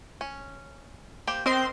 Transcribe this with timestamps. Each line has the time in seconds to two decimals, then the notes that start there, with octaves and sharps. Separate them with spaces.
0.21 C#4
1.27 A#3 G4 C5
1.46 C4 A#4 C5 D#5 C6